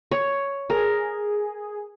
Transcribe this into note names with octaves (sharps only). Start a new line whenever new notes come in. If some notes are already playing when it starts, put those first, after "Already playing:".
C#5
G#4 A#4